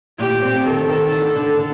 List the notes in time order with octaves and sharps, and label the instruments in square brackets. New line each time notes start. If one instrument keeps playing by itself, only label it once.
[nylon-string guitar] A#2 [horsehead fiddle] G4
[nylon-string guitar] C4
[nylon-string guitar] D#3 [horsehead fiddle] A4
[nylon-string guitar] D#3
D3
D3
D3